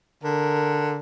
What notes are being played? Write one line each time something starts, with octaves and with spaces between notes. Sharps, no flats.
D3 A#4